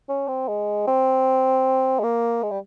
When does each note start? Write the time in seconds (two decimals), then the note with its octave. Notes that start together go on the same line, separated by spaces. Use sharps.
0.09 C#4
0.28 C4
0.48 G#3
0.87 C4
1.99 G#3
2.03 A#3
2.43 G#3
2.51 G3